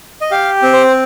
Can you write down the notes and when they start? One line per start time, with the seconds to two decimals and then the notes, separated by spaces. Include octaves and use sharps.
0.21 D#5
0.31 G4 F5
0.62 C4
0.73 C5